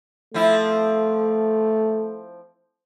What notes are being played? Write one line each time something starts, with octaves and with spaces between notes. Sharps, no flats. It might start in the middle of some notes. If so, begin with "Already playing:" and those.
F3 A3 C4 E4